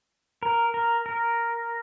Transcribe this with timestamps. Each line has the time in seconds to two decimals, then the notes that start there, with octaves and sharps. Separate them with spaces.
0.43 A#4
0.74 A#4
1.06 A#4